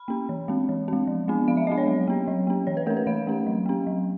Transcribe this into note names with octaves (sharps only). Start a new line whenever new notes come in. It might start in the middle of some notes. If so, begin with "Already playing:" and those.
Already playing: B5
A#3 C#4
E3
G#3 C4
E3
G#3 C4
F3
G#3 B3 D4
F3 F5
E5
G#3 B3 D4 D#5
C#5
F#3
A#3 C#4
F#3
A#3 C#4
E3 C#5
B4
A3 C#4 A#4
B4
E3 F5
A3 C#4
F#3
A#3 C#4
F#3